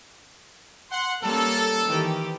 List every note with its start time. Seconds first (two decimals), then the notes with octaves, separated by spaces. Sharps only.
0.91 F#5 C6
1.22 G3 A#3 C#4 A4
1.86 D#3 E3 G4